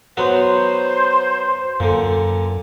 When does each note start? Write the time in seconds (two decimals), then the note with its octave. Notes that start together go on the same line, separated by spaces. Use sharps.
0.17 F#3 B3 F#4 C5
1.80 F#2 A#2 D3